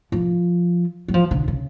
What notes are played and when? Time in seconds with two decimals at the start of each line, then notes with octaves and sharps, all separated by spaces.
0.12 F3
1.08 F#3
1.14 F3
1.31 D3
1.48 C#3